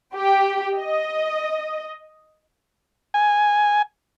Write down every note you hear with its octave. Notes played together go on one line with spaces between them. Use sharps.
G4
D#5
G#5